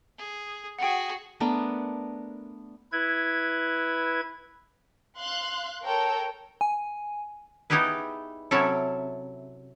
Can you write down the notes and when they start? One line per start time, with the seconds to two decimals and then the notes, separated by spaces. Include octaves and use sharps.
0.18 G#4
0.79 F#4 G#4 F#5 G5
1.40 A3 B3 D4 A#4
2.92 E4 B4 G#6
5.19 F5 C6 F#6
5.84 A4 A#4 C#5 G5
6.61 G#5
7.70 B3 D#4 E4 G4 G#4 B4
8.51 C3 F#3 C#4 E4 A4